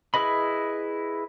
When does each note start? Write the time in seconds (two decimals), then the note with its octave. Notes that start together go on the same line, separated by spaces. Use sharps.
0.14 E4 G#4 B4 D#5 B5